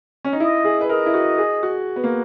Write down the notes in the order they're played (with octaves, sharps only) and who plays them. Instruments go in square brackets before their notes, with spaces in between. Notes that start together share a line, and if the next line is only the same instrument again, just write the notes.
[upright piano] C#4
D#4
[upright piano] E4 [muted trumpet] D#5
[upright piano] G#4
B4
[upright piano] A#4 [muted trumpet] D#5
[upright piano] E4
F#4
G#4
F#4
B3
A#3